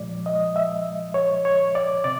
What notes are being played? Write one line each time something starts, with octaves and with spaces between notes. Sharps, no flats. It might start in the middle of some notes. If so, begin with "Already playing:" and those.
Already playing: A#2 F3 G#3 D5
D#5
E5
C#5
C#5
D5
C3 D5